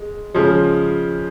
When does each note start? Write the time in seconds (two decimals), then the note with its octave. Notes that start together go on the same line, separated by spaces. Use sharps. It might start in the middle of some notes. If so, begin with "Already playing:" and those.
Already playing: G#3
0.34 C#3 F3 G#3